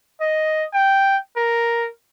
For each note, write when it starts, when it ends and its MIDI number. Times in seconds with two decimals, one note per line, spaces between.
0.21 0.64 75
0.73 1.16 79
1.36 1.88 70